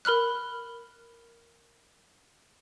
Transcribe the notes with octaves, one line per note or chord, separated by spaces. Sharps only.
A#4 B5 F6 F#6